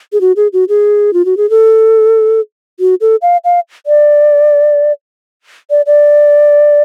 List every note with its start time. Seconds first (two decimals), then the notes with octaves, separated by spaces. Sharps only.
0.13 G#4
0.21 F#4
0.36 G#4
0.53 F#4
0.69 G#4
1.13 F4
1.25 F#4
1.37 G#4
1.50 A4
2.80 F#4
3.01 A4
3.22 F5
3.45 F5
3.86 D5
5.70 D5
5.86 D5